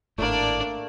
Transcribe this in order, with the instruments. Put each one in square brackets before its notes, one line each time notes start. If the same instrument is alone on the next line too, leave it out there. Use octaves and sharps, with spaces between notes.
[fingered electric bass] G#1 A2 [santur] A3 A#3 [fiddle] D4 D5